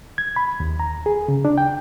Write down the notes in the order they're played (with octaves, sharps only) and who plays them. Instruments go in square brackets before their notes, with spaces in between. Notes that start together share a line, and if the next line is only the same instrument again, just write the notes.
[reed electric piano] G#6
B5
D#2
A#5
G#4
C#3
D4
G5